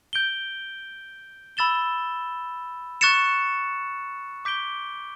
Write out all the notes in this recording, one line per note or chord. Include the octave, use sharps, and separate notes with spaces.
G6 D7 G7
B5 E6 A6 E7 G7
C#6 F#6 A6 C#7 E7
D6 G6 B6 D7 G7